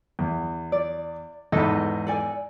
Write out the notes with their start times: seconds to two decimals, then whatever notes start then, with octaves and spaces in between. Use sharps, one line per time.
0.19 E2
0.72 D5
1.52 E2 G#2 A4 B4 D#5
2.07 A4 D5 G#5